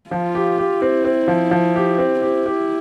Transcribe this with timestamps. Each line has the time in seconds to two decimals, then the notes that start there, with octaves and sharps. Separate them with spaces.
0.10 F3 F4
0.35 G4
0.58 G4
0.81 C4 E4
1.04 C4
1.28 F3
1.51 F3
1.76 G4
1.98 C4
2.22 E4 G4
2.46 G4